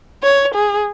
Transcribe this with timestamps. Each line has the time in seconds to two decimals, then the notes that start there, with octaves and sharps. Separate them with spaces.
0.23 C#5
0.55 G#4